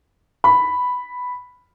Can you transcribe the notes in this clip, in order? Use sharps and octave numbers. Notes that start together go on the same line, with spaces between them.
B5